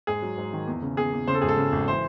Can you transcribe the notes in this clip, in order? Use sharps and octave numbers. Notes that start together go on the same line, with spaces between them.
G#2 G#4
F#3
G#2
D#3
E2
C#3
E2 G#4
E2
C#3 C5
A4
G#1 G#4
A4
C#3
G#1
E3 C5